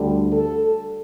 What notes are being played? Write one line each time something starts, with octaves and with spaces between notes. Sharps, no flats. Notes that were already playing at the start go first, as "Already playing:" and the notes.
Already playing: D2 D3 G3
A4